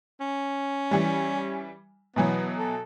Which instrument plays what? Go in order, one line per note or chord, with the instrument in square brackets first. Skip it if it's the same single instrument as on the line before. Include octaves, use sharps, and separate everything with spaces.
[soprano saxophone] C#4
[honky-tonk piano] E3 G3
[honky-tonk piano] B2 E3 F#3 [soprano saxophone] B3
[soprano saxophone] A4